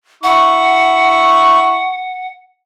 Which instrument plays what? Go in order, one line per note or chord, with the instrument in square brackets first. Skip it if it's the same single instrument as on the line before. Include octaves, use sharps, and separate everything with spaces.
[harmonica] E4 C#6 [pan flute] F#5